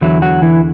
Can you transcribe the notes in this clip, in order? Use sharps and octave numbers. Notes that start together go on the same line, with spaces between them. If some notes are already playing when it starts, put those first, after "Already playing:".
E2 D3 E3 F#3 E4
F#3 F#4
E3 E4